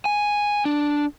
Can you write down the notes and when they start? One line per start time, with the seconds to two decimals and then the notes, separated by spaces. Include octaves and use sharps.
0.05 G#5
0.65 D4